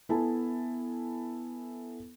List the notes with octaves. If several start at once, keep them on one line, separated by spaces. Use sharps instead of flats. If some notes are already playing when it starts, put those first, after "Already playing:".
B3 E4 A4 G#5 A5